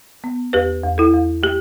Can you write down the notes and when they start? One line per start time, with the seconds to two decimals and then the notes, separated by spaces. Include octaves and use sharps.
0.24 B3
0.53 E2 G4 B4
0.83 E2
0.98 E4 A4
1.13 E2
1.43 A3 G4